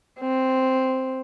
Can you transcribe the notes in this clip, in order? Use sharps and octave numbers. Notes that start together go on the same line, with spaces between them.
C4